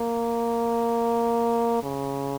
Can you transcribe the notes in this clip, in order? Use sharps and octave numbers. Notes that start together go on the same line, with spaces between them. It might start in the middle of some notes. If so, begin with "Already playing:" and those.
Already playing: A#3
C#3